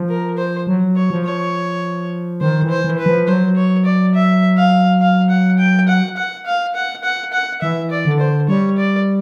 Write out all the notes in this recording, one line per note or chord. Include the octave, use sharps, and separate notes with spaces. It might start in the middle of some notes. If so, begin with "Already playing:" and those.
Already playing: F3
A#4
C5
F#3
C#5
F3
C#5
D#3 C5
E3
C5
E3
B4
F3
F#3 C5
C#5
D5
E5
F5
F5
F#5
G5
F#5
F#5
F5
F#5
F#5
F#5
E3 E5
D5
D3
C5
G3 C#5
D5